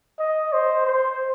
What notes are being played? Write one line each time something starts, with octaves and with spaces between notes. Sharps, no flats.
D#5
C5
C5